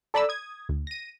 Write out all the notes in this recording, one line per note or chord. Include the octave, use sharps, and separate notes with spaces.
A4 D5 A#5 B5 D6 E6
D#6 G#6
D2
A#6 D#7